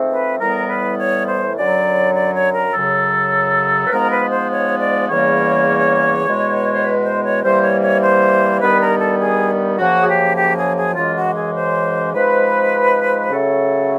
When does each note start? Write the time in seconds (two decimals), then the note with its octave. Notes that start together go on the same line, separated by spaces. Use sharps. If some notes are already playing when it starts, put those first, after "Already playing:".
Already playing: G#2 F3 A3 C4
0.10 B4
0.39 A2 E3 G3 B3 A#4
0.68 B4
0.98 C#5
1.27 C5
1.56 F#2 D3 F#3 D5
2.15 D5
2.35 C#5
2.54 A#4
2.74 F#2 C#3 F#3 A4
3.87 B4
3.92 G#2 F3 G#3 B3 A#4
4.11 B4
4.30 C5
4.50 C#5
4.79 D5
5.09 E2 C#3 E3 G3 A#3 C#5
6.26 E2 B2 G#3
6.74 C5
6.84 B4
7.04 C5
7.24 C#5
7.44 C3 E3 G3 A#3 C5
7.63 C#5
7.82 C#5
8.02 C5
8.61 G2 D#3 G3 B3 B4
8.80 A#4
9.00 A4
9.20 G#4
9.78 F#2 C#3 F3 A#3 F#4
10.01 G#4
10.08 G4
10.37 G4
10.56 G#4
10.76 G#4
10.96 F#2 C#3 E3 G#3 F4
11.16 F#4
11.35 G#4
11.55 C5
12.13 G#2 F3 G#3 C4 B4
13.30 C#3 F#3 A3 A4